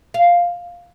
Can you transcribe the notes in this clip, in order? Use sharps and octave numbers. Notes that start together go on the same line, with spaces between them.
F5